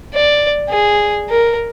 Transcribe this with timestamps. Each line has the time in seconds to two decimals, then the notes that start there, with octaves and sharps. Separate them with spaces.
0.14 D5
0.69 G#4
1.29 A#4